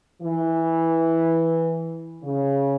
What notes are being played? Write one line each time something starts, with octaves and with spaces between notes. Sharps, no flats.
E3
C#3